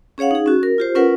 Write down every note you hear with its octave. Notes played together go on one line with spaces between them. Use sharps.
C#4 G#4 C#5 F5 F#5
D#4 G#4
C#4 F#4
A#4
F4 G4 C5
C#4 F4 A#4 B4 F#5